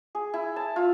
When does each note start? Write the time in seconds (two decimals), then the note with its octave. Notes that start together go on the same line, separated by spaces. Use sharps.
0.15 G#4
0.34 E4
0.56 A5
0.76 F4